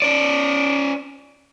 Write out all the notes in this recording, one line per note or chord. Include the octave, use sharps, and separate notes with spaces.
C#4 D5